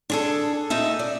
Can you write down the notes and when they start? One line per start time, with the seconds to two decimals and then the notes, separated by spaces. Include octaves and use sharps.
0.10 D4 G#4 A4
0.70 A#2 D#4 E5
0.99 D5